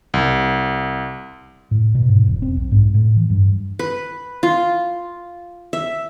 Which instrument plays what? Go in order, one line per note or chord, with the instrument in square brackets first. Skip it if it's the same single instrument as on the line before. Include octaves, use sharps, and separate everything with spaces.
[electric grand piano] C2
[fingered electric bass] A2
B2
G#2
E1
C4
B1
G#2
A2
E3
G2
[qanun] B4
F4
E5